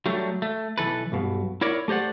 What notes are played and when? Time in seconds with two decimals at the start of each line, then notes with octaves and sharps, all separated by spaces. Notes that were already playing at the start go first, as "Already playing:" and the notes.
0.06 F#3 G3 A3 D4
0.42 A3
0.78 B1 E3 A4 B4
1.12 B1 G2 B2
1.61 E4 A#4 C#5 D5
1.88 A3 G4 C5 D5 F#5